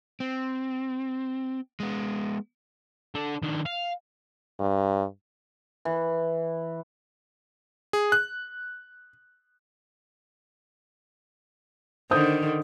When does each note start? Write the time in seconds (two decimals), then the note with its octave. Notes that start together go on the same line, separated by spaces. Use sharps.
0.20 C4
1.80 G#3 B3
3.15 D4 A4
3.43 D#3 D4
3.66 F5
4.60 G2
5.85 E3
7.93 G#4
8.12 F#6
12.11 D3 D#3 C5 D#6 G6